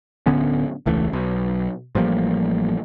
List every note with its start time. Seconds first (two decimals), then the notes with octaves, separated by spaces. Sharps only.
0.26 D1 D3 B3 C#4
0.86 E1 C#2 E3 A3
1.13 B1
1.95 A1 F3 G3 A#3